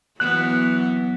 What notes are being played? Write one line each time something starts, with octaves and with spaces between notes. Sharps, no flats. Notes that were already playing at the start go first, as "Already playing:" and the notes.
E3 F#3 B3 F#6